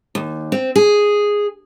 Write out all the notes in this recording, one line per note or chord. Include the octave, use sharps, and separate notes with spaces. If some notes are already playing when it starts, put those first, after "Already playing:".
D#2
C4
G#4